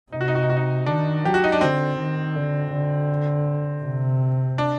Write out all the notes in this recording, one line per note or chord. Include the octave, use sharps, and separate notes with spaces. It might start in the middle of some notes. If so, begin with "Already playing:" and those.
C3 D#4
F#4
D#4
F#4
D#4
F#4
D#4
D#3 D4
F#3 G4
F#4
D#4
D4
D3 C4
D#3
D3
D3
C3
D4